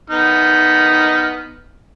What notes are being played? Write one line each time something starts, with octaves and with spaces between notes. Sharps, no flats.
B3 D#4 F6